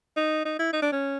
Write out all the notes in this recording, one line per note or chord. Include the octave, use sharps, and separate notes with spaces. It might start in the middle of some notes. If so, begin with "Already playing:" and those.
D#4
D#4
E4
D#4
D4
C#4